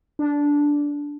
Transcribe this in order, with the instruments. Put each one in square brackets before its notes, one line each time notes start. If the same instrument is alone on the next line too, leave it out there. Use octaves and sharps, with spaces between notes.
[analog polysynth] D4